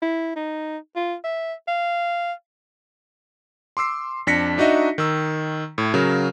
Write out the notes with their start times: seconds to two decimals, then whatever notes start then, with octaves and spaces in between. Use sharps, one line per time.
0.02 E4
0.36 D#4
0.96 F4
1.24 E5
1.68 F5
3.77 C6 D6 E6 C7
4.27 F2 D4 A#6 B6 C#7
4.58 D4 D#4 F#4 D#5 E5
4.98 D#3 E6
5.78 A2
5.94 C#3 F#3 A#4